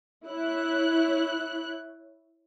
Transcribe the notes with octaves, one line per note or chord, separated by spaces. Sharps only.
E4 C#5 F#6